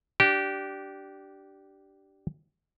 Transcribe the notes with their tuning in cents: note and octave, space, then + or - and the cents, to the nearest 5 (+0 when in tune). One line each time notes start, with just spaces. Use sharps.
D4 +0 G4 -20